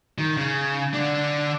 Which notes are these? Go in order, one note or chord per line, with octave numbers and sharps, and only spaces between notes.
D#3
C#3
D3 D4